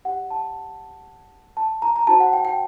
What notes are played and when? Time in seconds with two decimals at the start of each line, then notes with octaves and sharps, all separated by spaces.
0.05 G4 D5 F#5
0.31 A5
1.57 A5
1.82 A#5
1.96 A#5
2.07 D#4 F#4 C5 A5
2.20 F#5
2.33 G5
2.45 G5